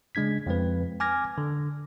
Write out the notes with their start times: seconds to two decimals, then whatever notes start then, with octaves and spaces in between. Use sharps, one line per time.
0.15 C#3 G#3 D4 G#6 B6
0.46 F2 F3 G#3 C4 B4
1.00 G#5 D6 F6 G#6 A#6
1.38 D3